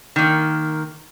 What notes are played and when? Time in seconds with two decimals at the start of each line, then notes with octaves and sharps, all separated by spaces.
0.16 D#3 A#3